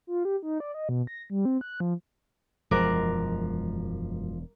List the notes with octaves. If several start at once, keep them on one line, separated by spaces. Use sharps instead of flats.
F4
G4
D#4
D5
D#5
B2
A#6
G3
C4
F#6
F3
E1 F#2 F3 G#3 A#4 D6 F#6